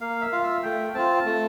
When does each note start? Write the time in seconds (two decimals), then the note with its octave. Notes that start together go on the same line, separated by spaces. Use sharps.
0.01 A#3 F5
0.21 E5
0.32 F4 F5
0.43 E5
0.63 A3 G5
0.94 C4 F4 A5
1.25 A3